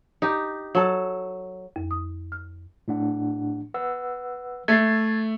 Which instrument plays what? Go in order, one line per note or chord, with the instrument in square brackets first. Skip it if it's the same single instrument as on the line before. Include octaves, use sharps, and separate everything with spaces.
[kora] D#4 G4
F#3 A4
[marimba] F2
D#6
F6
[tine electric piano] A2 D4 F#5
B4 F#5 E6
[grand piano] A3 [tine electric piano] G#6 A6 C7